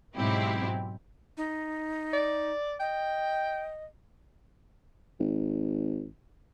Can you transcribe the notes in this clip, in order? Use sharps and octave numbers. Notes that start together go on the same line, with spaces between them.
G#2 B2 F#3 C4 E4 G4
D#4
D5
D#5 G5
G#1